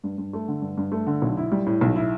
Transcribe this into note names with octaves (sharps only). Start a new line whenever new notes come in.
G2
G2
A3
D3
G2
G2
A3
D3
B1
E4
G3
A2
B1
E4